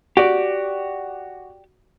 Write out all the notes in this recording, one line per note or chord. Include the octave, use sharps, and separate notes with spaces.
F#4 G4 D5